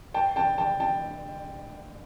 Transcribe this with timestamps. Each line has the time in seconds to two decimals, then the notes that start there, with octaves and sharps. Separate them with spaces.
0.14 G5 A5
0.36 G5 A5
0.58 G5 A5
0.80 G5 A5